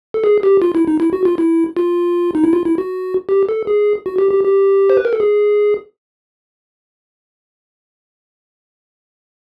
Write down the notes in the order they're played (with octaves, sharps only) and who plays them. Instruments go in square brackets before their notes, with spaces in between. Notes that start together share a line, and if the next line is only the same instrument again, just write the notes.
[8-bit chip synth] A4
G#4
G4
F4
E4
D#4
E4
F#4
F4
E4
F4
D#4
E4
F4
E4
F#4
G4
A4
G#4
F#4
G4
G4
G4
C5
B4
A#4
A4
G#4